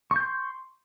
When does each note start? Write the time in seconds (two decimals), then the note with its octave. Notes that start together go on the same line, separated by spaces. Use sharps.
0.11 C#6
0.16 G6
0.21 C6